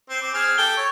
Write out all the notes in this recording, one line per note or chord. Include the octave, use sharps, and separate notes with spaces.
C4
C4 D6
C4 G#4 F6
G4 A4 G5
C#5